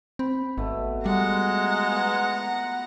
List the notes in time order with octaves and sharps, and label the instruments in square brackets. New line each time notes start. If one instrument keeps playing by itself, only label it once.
[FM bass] C4 [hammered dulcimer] B5
[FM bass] G#1 [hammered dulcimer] B2 A3
[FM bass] G3 [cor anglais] G#3 [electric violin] F#5 A#5
[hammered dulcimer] B3 F4